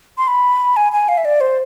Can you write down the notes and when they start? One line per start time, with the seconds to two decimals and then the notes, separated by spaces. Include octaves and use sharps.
0.18 C6
0.28 B5
0.76 G#5
0.92 G#5
1.09 F5
1.17 E5
1.25 D5
1.41 C5